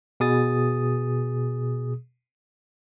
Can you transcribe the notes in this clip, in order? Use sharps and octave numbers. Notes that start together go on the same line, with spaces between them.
B2 G#4 D#6 A6